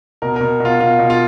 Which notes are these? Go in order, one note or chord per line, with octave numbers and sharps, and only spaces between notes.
B2 A#4
B2 A#4
B2
F4
B2 F4
B2
F4